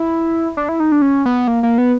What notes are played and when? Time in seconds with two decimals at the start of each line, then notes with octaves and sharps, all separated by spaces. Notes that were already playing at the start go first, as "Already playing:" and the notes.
Already playing: E4
0.57 D4
0.69 E4
0.80 D#4
0.92 D4
1.02 C#4
1.25 B3
1.48 A#3
1.63 A#3
1.78 B3